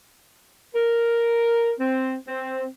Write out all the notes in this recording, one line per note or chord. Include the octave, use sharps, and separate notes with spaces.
A#4
C4
C4